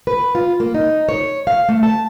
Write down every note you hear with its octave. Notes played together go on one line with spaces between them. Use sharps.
B4
F4
A#3
D#4
C#5
F5
A3
A5